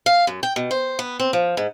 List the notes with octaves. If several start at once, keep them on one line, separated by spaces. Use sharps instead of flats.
F5
F#2
G5
B2
C5
B3
C4
F3
G#2